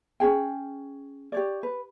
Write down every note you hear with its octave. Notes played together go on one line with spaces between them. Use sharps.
C#4 F#4 G#4 G5
G4 C#5 D5
B4